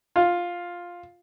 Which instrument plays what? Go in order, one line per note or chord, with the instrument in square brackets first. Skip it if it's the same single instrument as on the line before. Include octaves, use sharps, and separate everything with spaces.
[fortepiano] F4